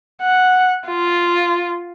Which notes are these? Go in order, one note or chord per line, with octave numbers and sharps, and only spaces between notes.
F#5
F4